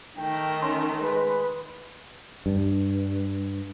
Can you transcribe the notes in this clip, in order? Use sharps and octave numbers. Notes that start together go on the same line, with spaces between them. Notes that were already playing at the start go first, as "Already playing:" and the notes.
D#3 A3 A#4 G5
C#4 C6
G#3 B4
G2